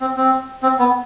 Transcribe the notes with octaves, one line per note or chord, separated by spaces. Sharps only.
C4
C4
C4
B3